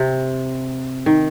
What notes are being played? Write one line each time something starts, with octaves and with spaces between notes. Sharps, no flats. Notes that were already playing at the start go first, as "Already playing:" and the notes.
Already playing: C3
D#3